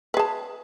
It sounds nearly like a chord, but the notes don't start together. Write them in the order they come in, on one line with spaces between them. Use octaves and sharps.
B4 G#4 A5